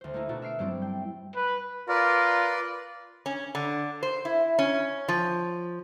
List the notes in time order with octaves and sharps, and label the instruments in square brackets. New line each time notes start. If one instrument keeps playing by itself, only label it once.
[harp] D2 C5
A3 A#3 D#4 E4
B2 A3 D4 E4 F#4
E5 F6 C7 D7
G2 F#3 G3 A3 C4 E4
G5
[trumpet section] B4
[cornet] F4 [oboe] A#4 [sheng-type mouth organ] B4 D5
[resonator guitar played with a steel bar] C#4
D3
C5
E4
C#4
F3